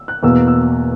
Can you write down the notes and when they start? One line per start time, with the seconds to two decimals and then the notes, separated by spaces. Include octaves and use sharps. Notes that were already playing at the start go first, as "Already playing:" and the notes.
Already playing: E6
0.08 F#6
0.23 E2 B2 A#3 E6
0.47 E6